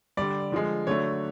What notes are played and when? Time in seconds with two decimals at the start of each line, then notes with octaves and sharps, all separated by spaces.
0.17 D3 G3 D5
0.52 D3 F3 G#3
0.87 D3 F#3 A3 C#5